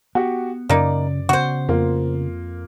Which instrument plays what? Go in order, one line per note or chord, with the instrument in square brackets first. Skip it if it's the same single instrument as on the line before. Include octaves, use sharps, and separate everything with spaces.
[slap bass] B3 [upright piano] F#4 G4
[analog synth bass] F#2 [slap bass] C#3 [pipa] A#3 D#4 [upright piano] D5
[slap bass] C#3 B3 [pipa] F#4 C5
[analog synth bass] F2 [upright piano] A#3 F4